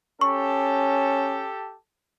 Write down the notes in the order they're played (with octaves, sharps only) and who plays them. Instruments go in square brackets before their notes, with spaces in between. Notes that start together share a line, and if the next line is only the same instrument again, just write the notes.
[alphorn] C#4 [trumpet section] G4 A4 A5 [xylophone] C#6